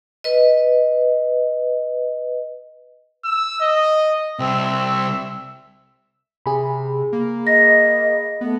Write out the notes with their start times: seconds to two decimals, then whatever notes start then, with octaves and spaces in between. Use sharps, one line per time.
0.24 B4 D#5
3.25 E6
3.61 D#5
4.39 C2 C4 E5
6.46 C3 G#4 B5
7.13 A#3
7.47 D#5 A#6
8.41 A3 B3